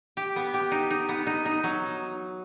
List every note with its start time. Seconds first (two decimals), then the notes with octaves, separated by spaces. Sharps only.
0.17 G4
0.36 B3
0.54 G4
0.71 D#4
0.90 D#4
1.09 B3
1.27 D#4
1.46 D#4
1.64 F#3